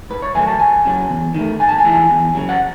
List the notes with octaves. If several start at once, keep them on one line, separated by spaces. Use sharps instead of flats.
G#2 B4
C#5
D#3 F#3 A3 G#5
A5
C#2 G#5
C#3 F#3
E2
D#3 A3
G#2 G#5
A5
G#5
E3 G#3
E2
C#3 F#3
F#5